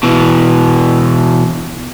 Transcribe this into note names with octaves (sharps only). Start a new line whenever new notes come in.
B2 E3